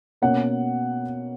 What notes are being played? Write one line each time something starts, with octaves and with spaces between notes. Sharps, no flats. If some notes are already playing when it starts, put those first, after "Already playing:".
B2 A#3 C#4 F#5